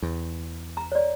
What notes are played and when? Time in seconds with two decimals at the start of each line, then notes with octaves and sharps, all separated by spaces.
0.02 E2
0.77 A#5
0.92 C#5 D5